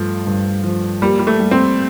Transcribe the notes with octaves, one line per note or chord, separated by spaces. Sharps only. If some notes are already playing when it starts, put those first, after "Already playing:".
Already playing: G2 F3 A3
G2
F3
G3 A#3
G3
A3
G3
C4